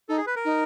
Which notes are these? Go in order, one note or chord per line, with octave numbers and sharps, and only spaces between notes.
D#4 A4
G#4
B4
A#4
D#4